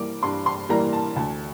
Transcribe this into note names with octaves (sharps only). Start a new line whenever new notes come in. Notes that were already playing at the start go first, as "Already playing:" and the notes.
Already playing: G2 E3 G3 A#3 D6
G2 C6
C6
E3 G3 A#3 A#5
A5
D2 A5